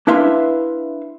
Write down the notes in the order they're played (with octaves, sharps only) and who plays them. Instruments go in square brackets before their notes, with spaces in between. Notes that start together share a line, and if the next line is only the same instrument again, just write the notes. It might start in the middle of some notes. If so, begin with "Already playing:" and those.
[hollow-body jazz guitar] D4 E4 B4 E5 F5 C6